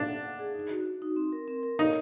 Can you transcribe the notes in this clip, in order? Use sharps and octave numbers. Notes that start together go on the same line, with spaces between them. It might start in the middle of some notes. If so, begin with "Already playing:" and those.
Already playing: D4
F#5
F#5
G#4
D#4
F#4
F#4
D#4
C4
A#4
C4
A#4
D#4 C#5